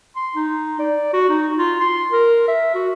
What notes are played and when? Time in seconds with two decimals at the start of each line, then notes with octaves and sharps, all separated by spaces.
0.16 C6
0.35 D#4
0.79 D5
1.13 F#4
1.29 D#4
1.57 F4
1.80 C6
2.12 A#4
2.48 E5
2.74 F#4